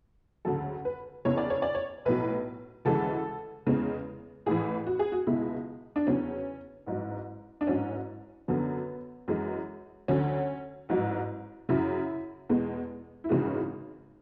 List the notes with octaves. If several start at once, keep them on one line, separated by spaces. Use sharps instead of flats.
D2 C#3 F#3 A4
B4
F#1 E2 C#3 C#5
D5
C#5
D5
C#5
B1 A2 F#3 B4
D2 C#3 E3 G#3 A4
E2 C#3 G#3
A1 A2 E3 G#4
F#4
G#4
F#4
C#2 B2 G#3 E4
D4
E2 C#3 F#3 C#4
A1 G#2 F#3
D4
A1 G#2 F#3 C#4
F#2 D3 F#3 B3
F#2 E3 G#3
D2 D3 F#3 C#4
A1 G#2 F#3
F#2 C#3 F#3 E4
E2 B2 G#3
E4
G#1 F#2 C#3 E3 G#3 F#4